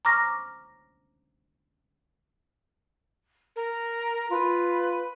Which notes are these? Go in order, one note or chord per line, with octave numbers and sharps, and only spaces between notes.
A#5 C#6 D6 F6 A#6
A#4
F4 B4